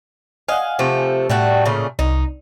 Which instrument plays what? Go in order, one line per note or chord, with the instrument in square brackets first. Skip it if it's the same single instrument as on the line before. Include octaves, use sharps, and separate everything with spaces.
[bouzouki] D#5 F5 [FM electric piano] F#5 G#5
[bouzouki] C3 F3 A3
[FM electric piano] A2 [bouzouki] G3 A3 F#4
[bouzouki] A#2 C#3 A3
[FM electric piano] C2 [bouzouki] D#4